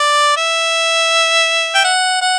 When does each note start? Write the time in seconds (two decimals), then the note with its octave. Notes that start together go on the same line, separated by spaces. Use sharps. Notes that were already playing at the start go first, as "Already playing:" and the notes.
Already playing: D5
0.37 E5
1.75 G5
1.84 F#5
2.21 F#5